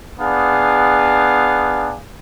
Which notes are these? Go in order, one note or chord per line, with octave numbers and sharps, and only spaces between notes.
B3 D4 G#4 F5